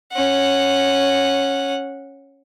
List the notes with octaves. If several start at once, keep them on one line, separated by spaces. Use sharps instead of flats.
C#4 F#5